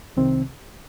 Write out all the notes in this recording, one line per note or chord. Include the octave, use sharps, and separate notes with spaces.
C2 C3 D#3 C4